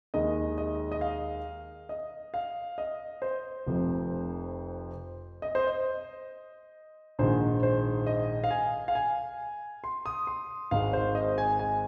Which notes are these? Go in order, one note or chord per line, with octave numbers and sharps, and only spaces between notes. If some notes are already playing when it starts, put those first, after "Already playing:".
D#2 D#3 G#3 D#5
D#5
D#5
F5
D#5
F5
D#5
C5
F1 F2 F3
D#5
C5
D#5
A#1 G#2 D#3 G#3 C5
C5
D#5
F5
G#5
F5
G#5
C6
D#6
C6
G#1 G#2 G#3 F5
C5
D#5
G#5
G#5